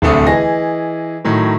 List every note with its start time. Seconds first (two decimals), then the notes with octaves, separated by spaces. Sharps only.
0.02 D1 C2 D3 A3 D#6
0.26 E3 G#4 D#5 A#6
1.25 A2 D#3 F#3